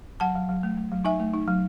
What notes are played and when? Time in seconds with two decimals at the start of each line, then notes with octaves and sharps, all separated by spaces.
0.20 F#3 F#5 A5
0.35 F#3
0.49 F#3
0.63 A3
0.77 A3
0.92 F#3
1.05 D#4 E5 G#5
1.20 A3
1.34 D#4
1.48 F#3